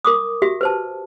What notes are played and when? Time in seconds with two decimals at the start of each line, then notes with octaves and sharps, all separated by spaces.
0.05 A#4 D6 D#6
0.42 F#4 G4 E5
0.61 B4 C5 A5